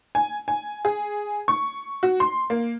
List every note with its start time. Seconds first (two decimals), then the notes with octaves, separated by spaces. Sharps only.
0.15 G#5
0.48 G#5
0.85 G#4
1.48 C#6
2.03 F#4
2.20 C6
2.50 A#3